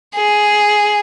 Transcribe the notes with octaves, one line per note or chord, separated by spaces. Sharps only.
G#4